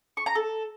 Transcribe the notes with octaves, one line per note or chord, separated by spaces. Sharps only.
C#6
A#5
A4